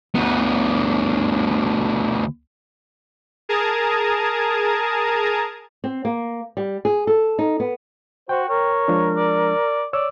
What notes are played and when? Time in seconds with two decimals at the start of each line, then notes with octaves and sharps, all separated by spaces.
0.15 D2 B3
3.49 G#4 A#4 A5 A#5 D#6 G#6
5.84 C4
6.05 A#3
6.57 G3
6.85 G#4
7.07 A4
7.39 D#4
7.60 B3
8.29 F#4 C5 G5
8.49 A#4 C#5
8.88 F3 G#3 D4
9.17 D5
9.93 C#5 D5 E6